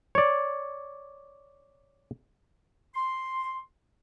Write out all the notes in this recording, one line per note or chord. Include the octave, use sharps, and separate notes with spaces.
C#5 D5
C6